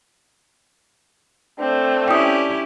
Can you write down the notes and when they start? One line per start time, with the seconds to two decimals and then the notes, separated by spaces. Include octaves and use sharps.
1.60 A3 C4 D4
2.08 C#4 E4 G4 G5 D#6